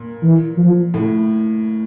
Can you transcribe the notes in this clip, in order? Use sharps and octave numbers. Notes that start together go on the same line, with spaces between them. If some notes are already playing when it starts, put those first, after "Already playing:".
Already playing: A#2
E3
F3
A2